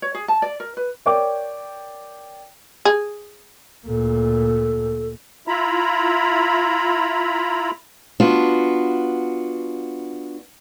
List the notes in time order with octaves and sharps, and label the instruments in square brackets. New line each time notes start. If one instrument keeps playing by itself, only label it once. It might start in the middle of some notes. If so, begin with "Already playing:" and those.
[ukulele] C#5
G#4
A5
D5
A#4
B4
[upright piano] A#4 C#5 D5 G5 D6
[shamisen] G#4
[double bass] D2 A#2 [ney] A4
[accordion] E4 F4 E5 A#5 B5
[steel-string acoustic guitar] B3 D4 F4 F#4